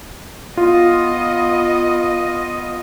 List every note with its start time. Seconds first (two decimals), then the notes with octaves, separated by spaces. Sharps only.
0.57 B3 F4 D#5